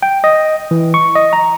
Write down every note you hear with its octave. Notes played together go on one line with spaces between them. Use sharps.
G5
D#5
E3
C#6
D#5
A#5